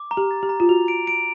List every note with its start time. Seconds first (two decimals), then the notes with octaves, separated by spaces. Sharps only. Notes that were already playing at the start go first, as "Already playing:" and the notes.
Already playing: D6
0.11 A#5
0.17 G4
0.31 A6
0.43 G4
0.49 A#5
0.60 F4
0.69 F#4 F7
0.88 D7
1.07 D7